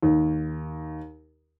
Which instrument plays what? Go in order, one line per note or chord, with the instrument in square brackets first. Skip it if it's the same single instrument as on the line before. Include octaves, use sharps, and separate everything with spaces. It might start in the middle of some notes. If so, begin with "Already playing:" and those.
[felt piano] D#2